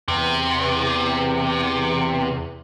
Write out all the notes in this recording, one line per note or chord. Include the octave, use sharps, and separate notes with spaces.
E2 C3